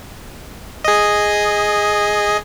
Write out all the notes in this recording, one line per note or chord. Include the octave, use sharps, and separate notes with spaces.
G#4 D#5